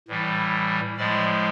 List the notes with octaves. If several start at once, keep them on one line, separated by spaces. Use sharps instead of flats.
A2 E3 G3
A2 F3 G#3 D5